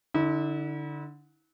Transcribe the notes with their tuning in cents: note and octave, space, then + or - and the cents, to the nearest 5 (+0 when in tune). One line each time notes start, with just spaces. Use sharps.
D3 +0 E4 -40